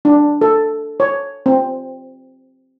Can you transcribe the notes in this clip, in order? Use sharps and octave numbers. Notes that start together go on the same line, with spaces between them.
D4
A4
C#5
C4